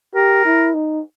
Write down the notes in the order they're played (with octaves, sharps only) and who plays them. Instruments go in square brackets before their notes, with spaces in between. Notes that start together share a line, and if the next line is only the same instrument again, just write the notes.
[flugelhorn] G4 [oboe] A#4
[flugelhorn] E4
D#4